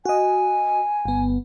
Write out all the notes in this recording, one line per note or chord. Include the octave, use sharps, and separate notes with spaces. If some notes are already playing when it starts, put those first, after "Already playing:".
F#4 D#5 G#5
G1 B3